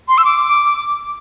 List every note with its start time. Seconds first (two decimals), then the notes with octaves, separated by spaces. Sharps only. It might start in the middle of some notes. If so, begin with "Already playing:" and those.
0.08 C6
0.18 E6
0.25 D6